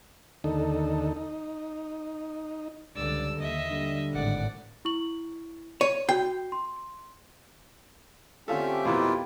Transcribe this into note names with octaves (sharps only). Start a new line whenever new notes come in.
D#2 D3 D#4 A4
D#4
C#2 G2 D3 D5 E6
D#2 D#5 E5
D3 G3
G#1 A2 D5 F#5
E4 C#6 F#7
C#5 D#7
F#4 G5 C7
C6
D3 A3 C4 C#4 F4 G4 A4 E5
F2 B2 E3 A#3 E4 F4